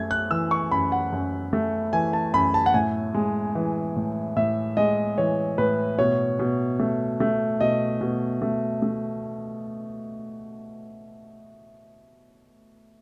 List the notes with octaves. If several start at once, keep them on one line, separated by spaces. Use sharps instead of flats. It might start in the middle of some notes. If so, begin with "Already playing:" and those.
Already playing: F#2 A3 G#6
F#6
E3 E6
C#6
F#2 B5
F#5
F#2
A3
E3 G#5
A5
F#2 B5
A5
F#5
A2 G#5
G#3
E3
A2
A2 E5
G#3 D#5
E3 C#5
A2 B4
B2 C#5
B2
A3
A3
B2 D#5
B2
A3
A3